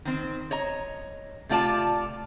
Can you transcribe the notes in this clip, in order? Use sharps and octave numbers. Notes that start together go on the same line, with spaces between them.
D#3 C4
C#5 D#5 A#5
C3 A3 F4 D5 A5